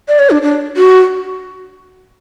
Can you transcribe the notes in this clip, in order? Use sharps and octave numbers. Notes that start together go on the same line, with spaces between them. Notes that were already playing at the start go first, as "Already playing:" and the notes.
D5
C#5
D4
D4
F#4